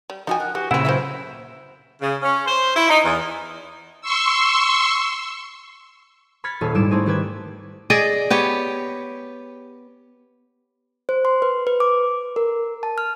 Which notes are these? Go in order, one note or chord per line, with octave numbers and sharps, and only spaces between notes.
G3
F3 D#4 F#4 G5 G#5
A#4 F#5
E3 F#4 G4
A#2 C#3 C4 E4 F#5 E6
F#3 A#3 B4 C5 E5
C#3
C#4
C5
E4
D#4
E2
C6 C#6 E6
B5 F6 G#6 A6 B6 C#7
D#1 G#4 A4 F5
G#2 G3 E4 D7 E7
A3 C4 C#4 D#4 E4 G#4
D#3 G4 B4 G#6
G#4 D5 D#5
B3 G4 C#5
C5
C6
B4
B4
D6
A#4
A5
F6